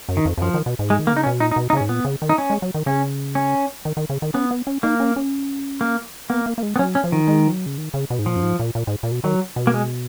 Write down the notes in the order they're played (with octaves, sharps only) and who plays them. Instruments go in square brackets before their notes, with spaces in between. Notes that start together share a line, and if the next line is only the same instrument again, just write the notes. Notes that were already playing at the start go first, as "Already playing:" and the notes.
[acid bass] F#2
[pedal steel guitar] D#3
[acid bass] F2
F2
[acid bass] F#2 [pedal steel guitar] F3
[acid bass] D#3
B2
G#2
[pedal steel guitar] G#3
[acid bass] D#3
[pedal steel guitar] A#3
[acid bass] C#3 [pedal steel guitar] D#4
[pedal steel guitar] C#4
[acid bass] B2
[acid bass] A#2 [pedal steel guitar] D#4
[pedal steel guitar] D#4
[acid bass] B2
[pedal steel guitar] D#4
[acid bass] C#3 [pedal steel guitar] C#4
[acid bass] G#2
[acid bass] A#2 [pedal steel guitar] B3
[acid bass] C#3
D#3
[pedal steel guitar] D#4
C#4
[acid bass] G#3
F#3
D#3
[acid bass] C#3 [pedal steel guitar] C#4
[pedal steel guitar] C#4
[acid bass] D#3
D#3
C#3
D#3
[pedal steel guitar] B3 [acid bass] C#4
[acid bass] B3
C#4
[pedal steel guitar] A#3 [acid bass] D#4
[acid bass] C#4
C#4
[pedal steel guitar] A#3
[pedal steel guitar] A#3 [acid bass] B3
[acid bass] A#3
A#3
G#3
[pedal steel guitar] B3
[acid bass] F#3 [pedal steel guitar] C#4
[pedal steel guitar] C#4
[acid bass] F3
[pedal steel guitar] D#3
[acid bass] G#3
F3
F#3
C#3
D#3
C#3
B2
G#2
[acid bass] A#2 [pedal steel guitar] F3
[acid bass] F#2
G#2
A#2
A#2
G#2
A#2
B2
[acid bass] D#3 [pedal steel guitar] F#3
[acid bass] B2
[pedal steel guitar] A#3
G#3